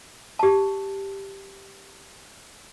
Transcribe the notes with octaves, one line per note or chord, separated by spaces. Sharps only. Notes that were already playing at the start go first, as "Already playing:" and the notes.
G4 A5